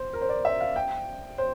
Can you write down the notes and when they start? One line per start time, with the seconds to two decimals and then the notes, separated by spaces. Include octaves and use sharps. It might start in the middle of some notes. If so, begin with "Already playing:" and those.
Already playing: C5
0.13 A#4
0.21 C5
0.29 D5
0.45 E5
0.60 F5
0.76 G5
1.38 C5